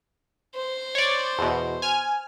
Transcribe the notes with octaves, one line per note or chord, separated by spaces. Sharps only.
C5
C#5 D5
E2 B2
G#5 F6